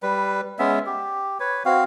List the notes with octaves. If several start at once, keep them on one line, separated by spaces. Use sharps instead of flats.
G3 B4
G#3 B3 C#4 E5
G4
B4 C#5
C4 F#4 F5